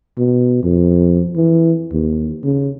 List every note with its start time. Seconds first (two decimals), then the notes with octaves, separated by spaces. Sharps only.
0.18 B2
0.63 F2
1.36 E3
1.93 D#2
2.44 C#3